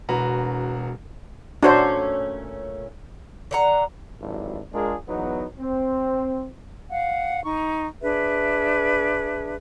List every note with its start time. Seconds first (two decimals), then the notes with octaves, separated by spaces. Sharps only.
0.09 E1 F#4 B4 A#5
1.63 A#2 A3 C#4 D4 F#4 C5
3.51 D3 F#5 A#5
4.21 G#1 G2 F#3 D4 E4
4.73 G#3 D4 F4 G#4 A#4
5.07 E2 F#3 B3 D#4
5.59 C4
6.89 F5 F#5
7.45 D#4 C#6
8.01 D4 G#4 B4 E5